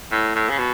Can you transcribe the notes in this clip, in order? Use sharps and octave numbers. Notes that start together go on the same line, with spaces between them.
A2
A2
C#3
B2